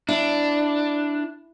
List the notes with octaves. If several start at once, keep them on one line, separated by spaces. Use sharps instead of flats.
D4 E4